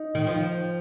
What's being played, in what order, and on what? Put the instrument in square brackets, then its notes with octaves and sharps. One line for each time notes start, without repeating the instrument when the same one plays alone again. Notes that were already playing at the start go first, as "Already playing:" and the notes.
Already playing: [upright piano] D#4
[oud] D#3
F3